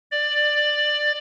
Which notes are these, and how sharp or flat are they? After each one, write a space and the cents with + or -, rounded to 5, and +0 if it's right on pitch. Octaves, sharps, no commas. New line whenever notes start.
D5 +15